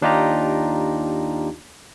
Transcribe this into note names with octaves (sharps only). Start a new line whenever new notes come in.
D#2 D4 D#4 F4 G4 A#5